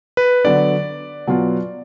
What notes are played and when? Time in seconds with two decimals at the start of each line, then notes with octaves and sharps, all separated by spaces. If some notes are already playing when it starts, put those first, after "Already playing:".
0.17 B4
0.45 D3 F#3 B3 D5
1.27 B2 F#3 B3 F4